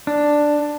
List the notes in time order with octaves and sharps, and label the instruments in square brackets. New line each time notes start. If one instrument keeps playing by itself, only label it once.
[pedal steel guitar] D4